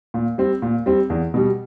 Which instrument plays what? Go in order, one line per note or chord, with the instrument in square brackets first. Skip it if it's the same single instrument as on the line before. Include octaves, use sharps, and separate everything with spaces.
[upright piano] A#2
G3 C4
A#2
G3 C4
E2
B2 G3